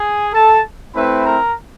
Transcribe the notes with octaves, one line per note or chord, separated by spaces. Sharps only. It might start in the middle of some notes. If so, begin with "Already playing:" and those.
Already playing: G#4 G#5
A4 A5
A3 C4 E4 B4 B5
A#4 A#5